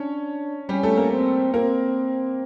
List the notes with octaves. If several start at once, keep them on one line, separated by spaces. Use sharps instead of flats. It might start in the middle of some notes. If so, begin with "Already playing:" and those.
Already playing: C#4 D4 C#5
G3 C#4 G4
A3 A4
A#3 A#4
C4
A#3 C4 A#4